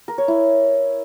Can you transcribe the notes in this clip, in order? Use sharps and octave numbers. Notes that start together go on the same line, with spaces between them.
A#4
C#5
E4